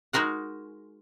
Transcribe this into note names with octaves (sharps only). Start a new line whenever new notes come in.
G#3 D#4 F#4 A#4 F#5